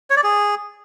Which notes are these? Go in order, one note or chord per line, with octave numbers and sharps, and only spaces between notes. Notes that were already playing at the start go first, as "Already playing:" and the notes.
C#5
D5
G#4